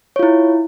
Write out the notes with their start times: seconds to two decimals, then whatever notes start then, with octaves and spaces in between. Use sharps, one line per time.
0.16 C#5
0.19 F4
0.23 E4